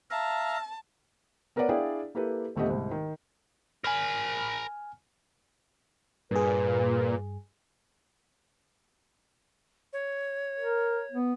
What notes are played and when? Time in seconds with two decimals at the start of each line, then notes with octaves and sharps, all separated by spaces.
0.11 E5 F5 A5 A#5
1.56 B3 A#4 B4 C#5 D5 F#5
1.69 D4 E4 G#4 D5 F5 G5
2.15 A#3 E4 G4 A4 B4
2.56 D#1 D3 A3 B3 G4 D#5
2.70 C2 G#2
2.91 D#3
3.84 A#4 G#5 B5 F6
6.31 G2 A#2 G#4 B4
9.93 C#5
10.59 A#4
11.11 B3